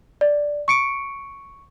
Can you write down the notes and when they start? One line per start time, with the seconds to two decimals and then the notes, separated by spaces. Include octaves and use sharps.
0.21 D5
0.68 C#6 C#7 D7